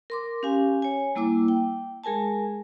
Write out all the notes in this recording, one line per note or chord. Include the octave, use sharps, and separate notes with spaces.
A#4 C6 D6
C#4 G4 F5 G#5
C#5 G#5
G3 A#3 E4 D6 E6
G5
G#3 G#4 A#4 G#5 A5